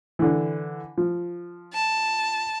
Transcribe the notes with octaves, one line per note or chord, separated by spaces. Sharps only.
D3 E3
F3
A5